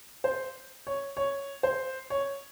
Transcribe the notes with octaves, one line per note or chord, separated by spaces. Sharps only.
C5
C#5
C#5
C5
C#5